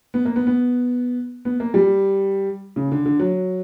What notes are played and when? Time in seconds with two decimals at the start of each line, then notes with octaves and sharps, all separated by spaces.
0.14 B3
0.25 A#3
0.36 B3
0.47 B3
1.45 B3
1.60 A#3
1.74 G3
2.76 C#3
2.92 D3
3.06 D3
3.20 F#3